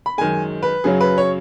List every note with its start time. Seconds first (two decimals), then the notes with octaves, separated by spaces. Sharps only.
0.06 B5
0.18 F#2 D#3 G#3 G#5
0.63 B4
0.84 F#2 C#3 F#3 G#4
1.01 B4
1.18 C#5